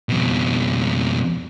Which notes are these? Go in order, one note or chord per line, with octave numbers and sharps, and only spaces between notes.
F2 B2